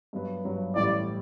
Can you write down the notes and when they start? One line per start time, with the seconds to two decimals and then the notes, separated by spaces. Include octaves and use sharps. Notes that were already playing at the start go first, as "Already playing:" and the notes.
0.13 G2 F#3 B3
0.44 G2 F#3 B3
0.75 A1 A2 G3 D5